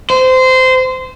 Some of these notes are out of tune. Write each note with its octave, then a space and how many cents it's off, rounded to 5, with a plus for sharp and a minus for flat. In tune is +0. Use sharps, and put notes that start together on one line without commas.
C5 -20